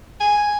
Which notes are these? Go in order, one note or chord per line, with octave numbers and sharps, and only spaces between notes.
G#5